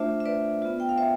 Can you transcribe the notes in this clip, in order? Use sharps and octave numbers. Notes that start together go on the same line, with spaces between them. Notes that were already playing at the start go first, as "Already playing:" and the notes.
Already playing: A3 D4 F4 C5 E5
E5
B4 D5
B3 F4
G5
F5
C5 E5